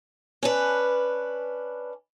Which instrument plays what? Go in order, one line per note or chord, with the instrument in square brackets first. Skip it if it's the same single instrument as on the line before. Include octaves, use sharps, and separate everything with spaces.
[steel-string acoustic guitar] C#4 D4 B4